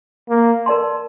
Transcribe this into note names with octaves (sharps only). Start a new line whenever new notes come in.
A#3
A#4 D5 A5 C6